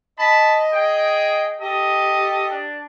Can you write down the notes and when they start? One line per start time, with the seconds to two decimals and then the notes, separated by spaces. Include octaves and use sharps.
0.19 D#5 A5 B5
0.72 G#4 G5
1.61 G4 A4 D#5
2.50 D4